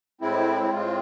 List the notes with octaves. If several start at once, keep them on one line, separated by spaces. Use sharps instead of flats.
A2 G#3 C4 E4
E4
A2 G#3 C4 F4